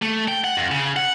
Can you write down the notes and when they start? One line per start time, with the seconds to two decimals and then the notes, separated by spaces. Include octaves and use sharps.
0.02 A3
0.28 G5
0.44 F#5
0.57 F2
0.71 C#3
0.96 F#5